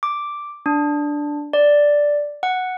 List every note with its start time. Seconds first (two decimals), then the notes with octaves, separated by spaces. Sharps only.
0.03 D6
0.66 D4
1.53 D5
2.43 F#5